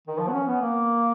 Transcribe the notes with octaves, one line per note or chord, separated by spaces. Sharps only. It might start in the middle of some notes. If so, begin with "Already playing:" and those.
D#3
F3
B3
C#4
B3
A#3